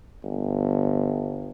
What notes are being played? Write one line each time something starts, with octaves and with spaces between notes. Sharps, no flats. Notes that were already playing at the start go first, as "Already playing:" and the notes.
G1